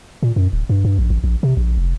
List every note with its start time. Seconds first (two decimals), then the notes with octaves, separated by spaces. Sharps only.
0.23 A#2
0.36 F#2
0.53 D1
0.69 G2
0.85 G2
0.98 A#1
1.10 A1
1.24 A#1
1.43 C3
1.57 A#1
1.77 F1